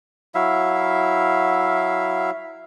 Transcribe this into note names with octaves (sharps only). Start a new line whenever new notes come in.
F#3 E4 E5 F5